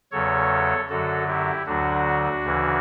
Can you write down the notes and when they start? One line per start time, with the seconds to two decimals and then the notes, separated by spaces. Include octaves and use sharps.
0.11 E2 C#3 F#3 A4 C#5
0.89 F#2 D3 F#3 F#4 A4
1.28 E4 G4
1.66 D2 D3 F#3 D4 F#4
2.44 D2 C#3 E3